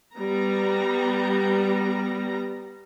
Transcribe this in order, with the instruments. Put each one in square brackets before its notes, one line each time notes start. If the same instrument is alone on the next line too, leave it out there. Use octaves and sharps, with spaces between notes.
[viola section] G3 B3 A#5